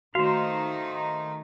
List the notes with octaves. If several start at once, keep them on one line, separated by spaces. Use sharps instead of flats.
D#3 A3 D#4 F#4 C5 F5